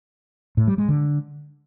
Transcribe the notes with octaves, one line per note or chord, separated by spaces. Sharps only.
A2
G3
G#3
D3